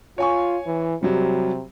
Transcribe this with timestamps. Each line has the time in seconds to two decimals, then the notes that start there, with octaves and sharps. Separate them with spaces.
0.18 F4 C#5 G#5 C#6
0.66 E3
1.03 C3 F#3 G3